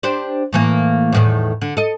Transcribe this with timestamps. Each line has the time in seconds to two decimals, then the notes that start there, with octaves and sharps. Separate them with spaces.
0.03 D4 G4 C5
0.53 A2 E3 A#3
1.12 E2 A2 D#3
1.61 D3
1.77 A4 D#5